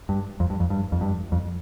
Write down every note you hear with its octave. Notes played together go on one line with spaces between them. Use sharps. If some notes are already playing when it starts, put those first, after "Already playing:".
G2
F2
G2
F2
G2
F2
G2
F2